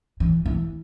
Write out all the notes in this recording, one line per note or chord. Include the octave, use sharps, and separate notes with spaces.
E3
E3